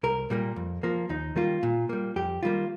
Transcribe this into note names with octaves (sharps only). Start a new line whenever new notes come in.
C2 A#4
A#2 G3 A#3
F2
F3 A#3
D#2 D#4
D#3 G3 A#3 F4
A#2
G3 A#3
F2 G4
D#3 G3 A#3 F4